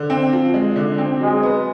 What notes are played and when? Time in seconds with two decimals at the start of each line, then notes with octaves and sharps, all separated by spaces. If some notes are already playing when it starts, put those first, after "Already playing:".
Already playing: D3
0.10 C4
0.33 F3
0.54 G#3
0.76 D3
0.98 C4
1.20 F#3 G#3
1.43 B3